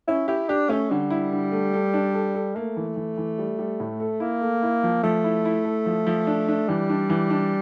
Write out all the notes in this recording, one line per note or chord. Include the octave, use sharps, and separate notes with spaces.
C#4 E4
E4 G4
D4 G4
A3 C#4
D3 G3
E4
D3
A3
A4
D4
A4
A4
A3 A#3
E3
E3
E3
G3
G3
A2
A4
A#3 E4
A3
E4
F3
F3 A3
E4
E4
A4
F3
F3
D4
D4
E3 G3
D4
E3
D4